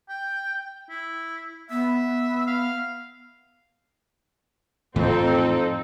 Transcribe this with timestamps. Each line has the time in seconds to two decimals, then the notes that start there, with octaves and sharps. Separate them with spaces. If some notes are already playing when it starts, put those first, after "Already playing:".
0.09 G5
0.90 E4
1.70 B3 E5
2.47 F5
4.96 F2 A2 E3 F3 C4 D#4 A4